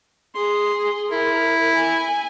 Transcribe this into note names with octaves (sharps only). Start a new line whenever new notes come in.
G#4 C6
E4 A#4
G#5